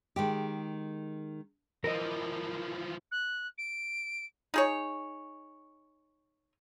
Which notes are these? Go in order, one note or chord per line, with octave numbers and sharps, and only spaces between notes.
D#3 G#3 G4
E3 F3 A#4 D#5
F#6
D7
D#4 G#4 C#5